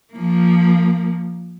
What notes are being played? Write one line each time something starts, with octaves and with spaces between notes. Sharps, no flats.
F3 A#3